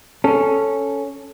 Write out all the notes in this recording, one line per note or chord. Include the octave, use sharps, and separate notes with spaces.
C#4 A4